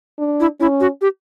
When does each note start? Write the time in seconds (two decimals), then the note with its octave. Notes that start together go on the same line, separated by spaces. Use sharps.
0.19 D4
0.40 E4
0.60 C#4 E4
0.80 F#4
1.01 G4